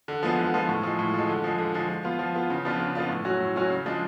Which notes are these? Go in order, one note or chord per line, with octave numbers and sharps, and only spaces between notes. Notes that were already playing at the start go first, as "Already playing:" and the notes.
D3
F3 G#3 B3
D3
F3 G#3 B3
A2
F3 G#3
A2
F3 G#3
D3
F3 G#3
D3
F3 G#3
F3
B3 F4
F3
B3 F4
C#3
F3 B3 D4 F4
C#3
F3 B3 D4 F4
A2
F#3 C#4 F#4
A2
F#3 C#4 F#4
C#3
F3 G#3 D4